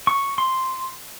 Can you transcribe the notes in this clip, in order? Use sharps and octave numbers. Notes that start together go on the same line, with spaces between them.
C#6
C6